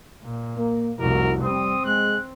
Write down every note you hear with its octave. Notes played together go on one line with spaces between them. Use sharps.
A#2
A#3
F1 C2 E4 F#4 A#4
G3 C4 D#6
G#3 F#6